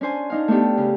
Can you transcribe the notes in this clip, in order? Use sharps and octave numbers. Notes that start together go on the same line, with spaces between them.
C#4 D4 C5 G#5
D4 D#4 F5
A3 B3 D4 G4
C#3